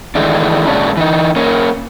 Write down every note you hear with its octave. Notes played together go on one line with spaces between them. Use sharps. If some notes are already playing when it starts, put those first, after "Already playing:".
D#3 E3 G#3 A3 D4
A#2 G#3 C#4 D4
E3 D#4
A#3 C#4